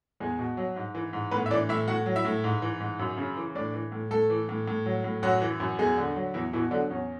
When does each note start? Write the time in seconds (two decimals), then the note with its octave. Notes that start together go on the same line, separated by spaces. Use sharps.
0.20 E2 G#3 G#4
0.39 B2
0.57 F#3
0.76 G#2
0.95 E3
1.13 G#2
1.31 A2 B3 B4
1.46 E5
1.51 E3 D4 D5
1.69 A2 E4 E5
1.88 A2 F#4 F#5
2.06 F#3
2.16 E4 E5
2.25 A2
2.44 G#2
2.62 E3
2.80 G#2
2.99 F#2
3.18 C#3
3.37 E3
3.55 A2 D4 D5
3.74 E3
3.92 A2
4.11 A2 A3 A4
4.30 E3
4.49 A2
4.68 A2
4.86 F#3
5.04 A2
5.22 F#2 F#3 F#4
5.42 E3
5.60 F#2
5.78 E2 G#3 G#4
5.97 D3
6.16 F#3
6.34 E2 E3 E4
6.53 B2 E3 E4
6.71 D3 F#3 D4
6.90 E2 C#4